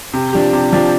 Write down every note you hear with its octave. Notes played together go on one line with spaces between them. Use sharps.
C3
F3 D4 G4
C3
F3 D4 G4